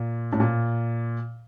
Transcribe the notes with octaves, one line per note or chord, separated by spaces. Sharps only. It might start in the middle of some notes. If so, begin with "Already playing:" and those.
Already playing: A#2
A2
A#2